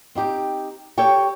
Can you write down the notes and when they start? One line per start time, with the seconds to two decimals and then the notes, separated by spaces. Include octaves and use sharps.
0.15 C4 D#4 G4
0.98 G4 A4 C#5 G5